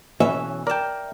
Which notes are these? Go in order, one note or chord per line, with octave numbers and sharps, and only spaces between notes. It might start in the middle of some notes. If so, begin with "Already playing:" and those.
B1 E3 C#4 E5
A#4 D5 G5 A5